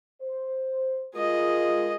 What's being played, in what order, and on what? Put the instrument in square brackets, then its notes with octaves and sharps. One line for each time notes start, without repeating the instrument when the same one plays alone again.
[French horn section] C5
[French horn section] G#3 F4 A#4 [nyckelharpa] G#4 D#5